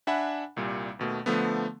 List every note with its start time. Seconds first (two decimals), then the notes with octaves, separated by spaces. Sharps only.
0.07 D4 E5 F#5 G#5 B5
0.56 C2 A#2 G3
0.99 D#2 B2 A3
1.26 D3 F3 A3 B3